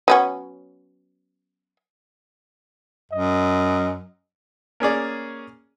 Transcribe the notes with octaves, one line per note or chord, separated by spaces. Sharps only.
F#3 B3 C#4
F#2 D#5
A#3 C#4 G#4 D5